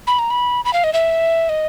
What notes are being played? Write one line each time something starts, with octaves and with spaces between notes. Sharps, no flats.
B5
A#5
B5
B5
F5
D#5
E5
D#5